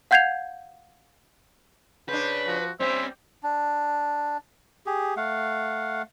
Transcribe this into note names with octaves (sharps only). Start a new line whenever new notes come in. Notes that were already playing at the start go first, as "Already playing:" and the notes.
F5 F#5 G6 G#6 C7 F7
C#3 D4 B4 C5
F3 F#4
G3 C4 C#4 C5 E5
D4
G4 G#4
A3 F5 F#5